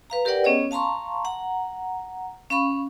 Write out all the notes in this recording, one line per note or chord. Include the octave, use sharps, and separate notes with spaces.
B4 F5 A#5
G4 A#4 B4 D5 F#5 G5
B3 C#4 G#4 C#5 D#5
F5 A5 A#5 C6 C#6
F#5 A#5
C#4 F5 B5 C#6